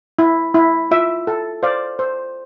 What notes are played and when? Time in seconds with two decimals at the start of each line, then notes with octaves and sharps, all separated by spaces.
0.19 E4
0.54 E4
0.91 F4 E5
1.27 A4
1.63 C5 D5 F5
1.99 C5